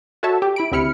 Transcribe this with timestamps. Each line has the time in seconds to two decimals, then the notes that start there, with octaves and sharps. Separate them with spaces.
0.23 F#4 A4 C#5 E5 A5
0.42 G4
0.56 E4 B5 D7
0.72 D2 C3 E4 B5 F6 C#7